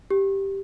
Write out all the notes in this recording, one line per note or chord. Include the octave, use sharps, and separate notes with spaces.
G4